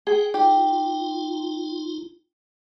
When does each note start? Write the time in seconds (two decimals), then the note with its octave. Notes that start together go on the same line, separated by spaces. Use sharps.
0.07 G#4 F#5 G5
0.34 D#4 F4 G4